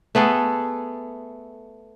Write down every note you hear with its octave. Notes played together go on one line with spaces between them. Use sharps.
A3 B3 G#4 A4